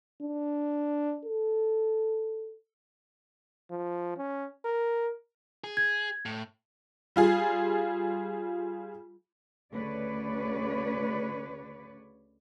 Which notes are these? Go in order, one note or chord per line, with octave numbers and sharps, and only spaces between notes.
D4
A4
F3
C#4
A#4
G#4
G#6
A2
G3 F4 G#4
D2 C#3 B4 C#5 D5